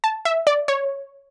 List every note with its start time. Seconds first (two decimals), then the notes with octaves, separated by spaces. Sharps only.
0.04 A5
0.25 E5
0.47 D5
0.68 C#5